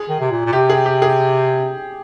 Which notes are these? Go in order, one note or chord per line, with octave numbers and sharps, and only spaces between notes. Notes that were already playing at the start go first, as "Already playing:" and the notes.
Already playing: G#4
D#3
C3
A#2
A#2
C3 G4
G#4
G4
G#4